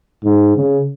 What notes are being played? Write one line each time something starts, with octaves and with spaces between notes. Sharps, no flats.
G#2
C#3